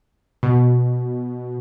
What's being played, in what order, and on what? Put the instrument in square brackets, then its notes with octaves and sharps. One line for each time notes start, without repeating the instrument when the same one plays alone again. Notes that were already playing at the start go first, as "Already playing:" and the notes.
[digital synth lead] B2